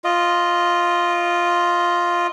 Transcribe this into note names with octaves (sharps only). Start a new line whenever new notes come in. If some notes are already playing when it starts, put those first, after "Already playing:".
F4 D#5